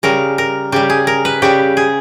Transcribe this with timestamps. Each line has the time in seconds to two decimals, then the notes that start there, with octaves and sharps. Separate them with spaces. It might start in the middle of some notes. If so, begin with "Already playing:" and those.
0.03 C#3 G3 A#4
0.38 A#4
0.72 C#3 G3 G4
0.90 G#4
1.07 A#4
1.25 B4
1.42 C#3 G3 G4
1.77 G#4